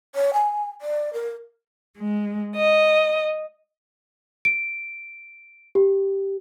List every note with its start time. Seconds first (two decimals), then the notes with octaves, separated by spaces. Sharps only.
0.15 C#5
0.34 G#5
0.81 D5
1.13 A#4
1.99 G#3
2.55 D#5
4.45 D7
5.75 G4